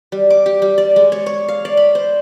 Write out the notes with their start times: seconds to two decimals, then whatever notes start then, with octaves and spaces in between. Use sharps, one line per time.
0.12 G3
0.30 D6
0.46 G4
0.62 G3
0.78 D5
0.96 G#3
1.12 C#5
1.26 C#5
1.48 F5
1.65 D5
1.77 B5
1.95 C5